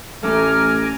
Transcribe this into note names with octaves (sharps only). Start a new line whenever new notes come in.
A1 A3 G#5 A#5 D6 F6